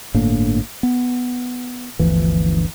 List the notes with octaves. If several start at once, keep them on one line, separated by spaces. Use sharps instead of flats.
G1 A2 A#3 D4
B3
G1 D2 E3 F3